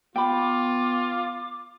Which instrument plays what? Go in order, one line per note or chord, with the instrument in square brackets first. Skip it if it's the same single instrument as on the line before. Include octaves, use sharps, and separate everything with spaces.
[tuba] B3 [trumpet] F4 [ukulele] G5 B5 [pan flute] D6